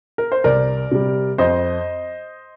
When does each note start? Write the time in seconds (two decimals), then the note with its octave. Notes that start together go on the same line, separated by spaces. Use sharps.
0.18 A#4
0.32 C5
0.44 C2 A#4 D5
0.91 C3 G3
1.38 F2 C5 D#5